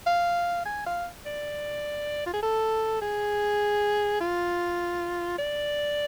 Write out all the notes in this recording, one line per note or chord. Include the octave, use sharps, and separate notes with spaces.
F5
G#5
F5
D5
F4
G#4
A4
G#4
F4
D5